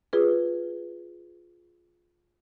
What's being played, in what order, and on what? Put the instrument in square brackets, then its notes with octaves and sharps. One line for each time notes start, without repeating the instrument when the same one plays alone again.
[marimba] F4 G#4 B4